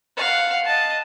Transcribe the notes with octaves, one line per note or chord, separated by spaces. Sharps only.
F5 F#5
D#5 A5